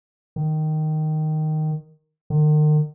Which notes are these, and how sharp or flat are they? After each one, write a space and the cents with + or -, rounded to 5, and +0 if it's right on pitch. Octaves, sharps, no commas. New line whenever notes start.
D#3 -5
D#3 -40